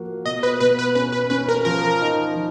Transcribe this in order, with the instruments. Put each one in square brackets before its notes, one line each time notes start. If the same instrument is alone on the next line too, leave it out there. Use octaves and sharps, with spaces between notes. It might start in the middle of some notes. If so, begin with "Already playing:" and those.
Already playing: [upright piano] F3 A#3 F#4
[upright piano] B2 [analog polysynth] D#5
[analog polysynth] B4
[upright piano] B2 [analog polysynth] B4
[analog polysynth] B4
[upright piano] C#4 [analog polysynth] B4
[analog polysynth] B4
[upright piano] C#4 [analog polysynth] B4
[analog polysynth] A#4
[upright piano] F3 [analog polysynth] A#4
[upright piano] D#4
F3